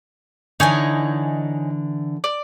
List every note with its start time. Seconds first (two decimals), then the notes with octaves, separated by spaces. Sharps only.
0.60 D3 E3 D#4 C#5 G#5
2.24 D5